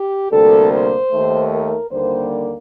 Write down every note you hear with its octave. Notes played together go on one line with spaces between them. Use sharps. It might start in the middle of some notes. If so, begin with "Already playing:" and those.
Already playing: G4
D2 C3 G3 A#3 A4
C5
D#2 D#3 A3
A#4
D#2 D3 G3 A#3 C5